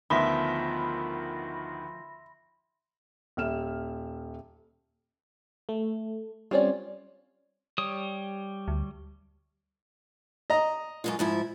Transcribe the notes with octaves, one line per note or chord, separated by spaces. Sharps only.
D2 D#3 F3 B3 E5 B5 C6 A#6
D#1 E5 F6 E7
A3
G3 C4 C#4 F4 C#5 D5
G3 C#5 D#6
D2
D#5 A#5
F#2 G#3 F4
G#2 F3 E4